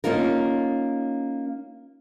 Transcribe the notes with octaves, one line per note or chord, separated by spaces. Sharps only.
A#3 C#4 D#4 F4 A#4